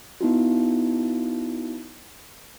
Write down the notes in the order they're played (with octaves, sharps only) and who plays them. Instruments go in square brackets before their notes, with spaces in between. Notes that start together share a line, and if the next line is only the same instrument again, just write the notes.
[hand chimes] B3 D#4 E4 F#4